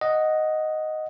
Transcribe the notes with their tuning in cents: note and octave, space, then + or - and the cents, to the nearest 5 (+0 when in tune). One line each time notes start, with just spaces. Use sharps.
D#5 +0 F#5 +0